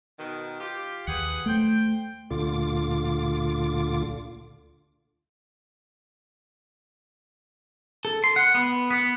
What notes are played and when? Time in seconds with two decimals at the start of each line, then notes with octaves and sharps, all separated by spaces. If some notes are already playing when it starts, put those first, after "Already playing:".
0.18 B2 D#3
0.59 F4 G4
1.08 D#2 G#4 B4 F#5
1.46 A3 C5 G5
2.31 D2 A#2 D3 F4 D6
8.05 A4
8.24 C6
8.36 F#5
8.55 B3
8.91 B3